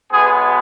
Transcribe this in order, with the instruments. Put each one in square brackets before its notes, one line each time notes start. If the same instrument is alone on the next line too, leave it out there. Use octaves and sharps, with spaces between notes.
[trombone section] B1 B2 G#3 B3 G#4